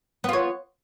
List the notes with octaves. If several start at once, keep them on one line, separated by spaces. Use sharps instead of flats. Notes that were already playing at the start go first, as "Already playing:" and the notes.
B3 F4 C#5